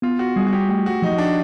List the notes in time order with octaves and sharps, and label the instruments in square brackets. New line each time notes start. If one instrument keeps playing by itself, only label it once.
[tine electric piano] B3 [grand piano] F4
[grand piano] F#4
[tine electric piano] G3 [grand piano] G#4
[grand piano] F#4
G4
[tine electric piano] A3 [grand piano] G4
[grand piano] F#4
[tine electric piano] F3 [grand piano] D#4
[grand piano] D4